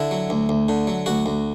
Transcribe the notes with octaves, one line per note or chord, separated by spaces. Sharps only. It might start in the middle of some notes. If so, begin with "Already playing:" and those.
Already playing: D3 E4
F#3
D2
D2
D3
F#3
D2 F#4
D2